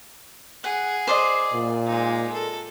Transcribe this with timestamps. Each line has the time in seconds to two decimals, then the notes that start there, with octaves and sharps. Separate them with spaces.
0.64 G#4 F#5
1.07 C5 D5 D#5
1.54 A#2
1.87 G#3 D#4
2.33 A4